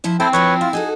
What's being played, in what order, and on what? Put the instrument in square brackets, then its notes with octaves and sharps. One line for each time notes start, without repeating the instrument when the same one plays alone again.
[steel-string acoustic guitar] F3 E4 C5
[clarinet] C4 [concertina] E4 A4 G5 [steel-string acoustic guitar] C5
[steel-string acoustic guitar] F3 E4 F4 [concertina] B4 C#5 C#6
[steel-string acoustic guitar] E4 [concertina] F4
[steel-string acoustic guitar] D#4 F#4 A4 [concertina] G#4